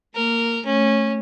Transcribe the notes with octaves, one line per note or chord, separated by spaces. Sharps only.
A#3 A#4
A3 C#4